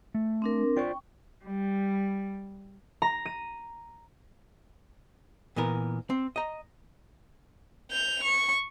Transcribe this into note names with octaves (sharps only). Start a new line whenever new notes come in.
A3
C4 D4 A#4
F4 C5 D5 G5 C#6
G3
A#5
D#7
A#2 E3 B3 A#4
C4
D#5 A#5
G6 F7
C#6